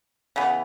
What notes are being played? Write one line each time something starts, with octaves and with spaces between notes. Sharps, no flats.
C#3 E3 B3